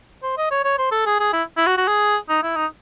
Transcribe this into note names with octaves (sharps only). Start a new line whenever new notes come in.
C5
D#5
C#5
C#5
C5
A4
G#4
G#4
E4
E4
F#4
F#4
G#4
D#4
E4
D#4